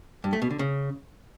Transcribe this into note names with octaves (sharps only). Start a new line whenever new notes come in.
G2
A3
B2
D3
C#3